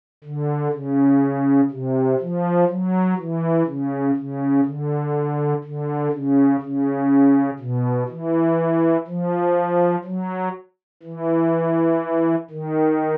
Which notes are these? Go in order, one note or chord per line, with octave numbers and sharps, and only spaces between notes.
D3
C#3
C3
F3
F#3
E3
C#3
C#3
D3
D3
C#3
C#3
B2
E3
F3
F#3
E3
D#3